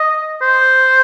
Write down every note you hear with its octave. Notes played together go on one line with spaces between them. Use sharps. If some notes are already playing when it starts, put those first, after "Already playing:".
Already playing: D#5
C5